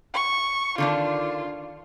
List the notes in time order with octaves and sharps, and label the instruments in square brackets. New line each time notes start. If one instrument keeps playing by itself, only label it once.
[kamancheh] C#6
[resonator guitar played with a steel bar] D3 D#3 D4 [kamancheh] F4